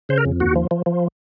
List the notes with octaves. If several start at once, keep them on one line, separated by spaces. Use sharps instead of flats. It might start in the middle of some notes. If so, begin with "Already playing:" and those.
C#3 C5
A#4
F2
D#2 F#4
F3
F3
F3